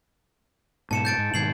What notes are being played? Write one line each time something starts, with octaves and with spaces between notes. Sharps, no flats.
G#2 B2 A5 C#7 E7
G6 A6 D7
G#2
G#2 B2 D#3 G#6 C7 F#7